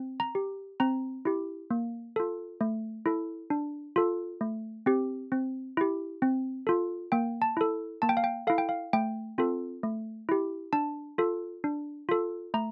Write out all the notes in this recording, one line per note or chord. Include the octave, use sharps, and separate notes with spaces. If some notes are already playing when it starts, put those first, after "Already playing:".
Already playing: C4
A#5
G4
C4 A#5
E4 G4
A#3
F4 A4
A3
E4 A4
D4
F4 A4
A3
C4 G4
C4
E4 G4
C4
F4 A4
A#3 G5
A5
E4 A4
A#3 A5
G5
F5
G5
E4 A4 F5
G5
F5
A3 G5
C4 F4 A4
A3
E4 G4
D4 A5
F4 A4
D4
F4 A4
A3 A#5